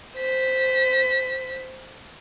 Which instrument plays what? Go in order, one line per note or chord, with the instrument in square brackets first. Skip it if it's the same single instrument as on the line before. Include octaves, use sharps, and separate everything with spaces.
[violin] C5 B6